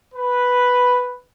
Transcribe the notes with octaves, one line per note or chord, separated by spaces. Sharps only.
B4